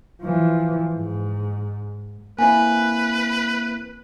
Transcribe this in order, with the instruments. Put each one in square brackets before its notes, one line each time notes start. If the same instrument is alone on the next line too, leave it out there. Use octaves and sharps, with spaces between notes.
[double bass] E3 F3
G#2
[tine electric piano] A#3 C4 E4 [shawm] B4 [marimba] G#5